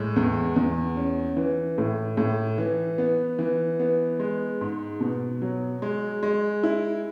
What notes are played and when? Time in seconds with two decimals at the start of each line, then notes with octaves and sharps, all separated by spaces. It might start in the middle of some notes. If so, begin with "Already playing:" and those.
Already playing: A2 G#3
0.16 E2
0.56 E2
0.97 C#4
1.37 E3
1.78 A2
2.17 A2
2.58 E3
2.98 B3
3.39 E3
3.80 B3
4.20 G#3
4.61 G#2
5.00 B2
5.42 F#3
5.82 G#3
6.23 G#3
6.63 E4